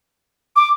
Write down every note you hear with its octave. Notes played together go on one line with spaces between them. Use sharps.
D6